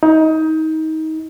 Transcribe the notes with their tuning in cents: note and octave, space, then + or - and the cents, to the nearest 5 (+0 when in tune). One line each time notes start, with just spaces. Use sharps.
D#4 +25